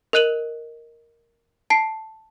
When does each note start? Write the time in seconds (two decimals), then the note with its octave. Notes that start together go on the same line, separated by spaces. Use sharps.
0.13 A#4 D#5 F#6 D#7 F#7
1.70 A5 C7